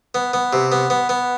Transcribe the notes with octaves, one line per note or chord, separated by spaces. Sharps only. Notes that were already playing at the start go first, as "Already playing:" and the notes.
B3
B3
C3
B3
B3
B3